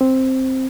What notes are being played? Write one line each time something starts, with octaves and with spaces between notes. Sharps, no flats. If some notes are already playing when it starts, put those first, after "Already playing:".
C4